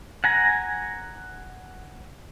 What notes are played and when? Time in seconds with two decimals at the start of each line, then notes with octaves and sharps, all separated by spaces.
0.24 F#5 G#5 A#5